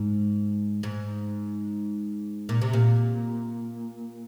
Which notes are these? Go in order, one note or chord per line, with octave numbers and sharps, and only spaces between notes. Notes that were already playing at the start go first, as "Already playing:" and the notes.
Already playing: G#2
G#2
A#2
C3
A#2